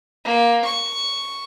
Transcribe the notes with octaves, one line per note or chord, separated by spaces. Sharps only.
A#3
C#6